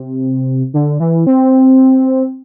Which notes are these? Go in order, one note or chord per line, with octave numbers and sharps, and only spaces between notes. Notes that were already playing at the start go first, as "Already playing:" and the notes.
Already playing: C3
D3
E3
C4